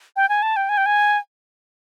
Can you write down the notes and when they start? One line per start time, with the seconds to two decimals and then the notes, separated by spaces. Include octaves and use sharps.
0.16 G5
0.29 G#5
0.42 A5
0.56 G5
0.69 G#5
0.77 G5
0.86 G#5